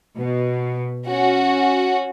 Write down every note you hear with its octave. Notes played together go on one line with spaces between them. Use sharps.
B2
C#4 F#4